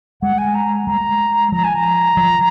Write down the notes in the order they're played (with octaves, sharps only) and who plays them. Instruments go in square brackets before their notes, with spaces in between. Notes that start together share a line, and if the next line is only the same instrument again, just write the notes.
[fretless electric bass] G#3 [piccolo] F#5
[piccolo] G#5
A#5
[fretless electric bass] G#3 [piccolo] A#5
[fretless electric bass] F3 [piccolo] A#5
[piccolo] G#5
A#5
[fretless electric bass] F3